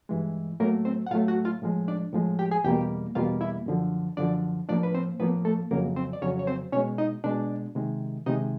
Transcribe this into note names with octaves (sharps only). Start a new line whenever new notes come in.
G2 E3 G#3
A2 F#3 A3 A#3 A#4
C4 C5
F#5
A2 F#3 A3 F4 F5
F#4 F#5
F4 F5
A2 F3 G#3
D4 D5
A2 F3 G#3
G4 G5
G#4 G#5
E2 B2 G3 A#3 G4 G5
E2 B2 G3 A#3 F4 F5
E4 E5
F#2 D3 F3
F#2 D3 F3 D4 D5
A2 F3 A#3 D4 D5
B4
C4 C5
A2 F3 A#3 B3 B4
A3 A4
F2 C#3 F#3 A#3 A#4
C4 C5
D5
F2 C#3 F#3 C#4 C#5
C#5
C4 C5
B2 G#3 C#4 C#5
D#4 D#5
B2 G#3 D4 D5
C3 D#3 G#3
C3 D#3 G#3 D#4 D#5